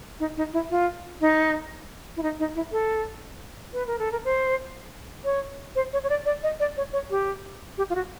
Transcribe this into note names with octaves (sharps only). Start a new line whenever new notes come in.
D#4
D#4
E4
F4
D#4
E4
D#4
D#4
E4
A4
B4
A#4
A4
A#4
C5
C#5
C5
C#5
C#5
D5
D5
D#5
D5
C#5
C#5
G4
G4
F4
F#4